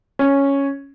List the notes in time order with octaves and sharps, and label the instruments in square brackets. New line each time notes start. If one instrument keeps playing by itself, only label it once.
[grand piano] C#4